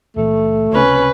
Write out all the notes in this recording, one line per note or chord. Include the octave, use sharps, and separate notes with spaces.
C#2 A#2 E3 A3
C#2 C3 C#4 B4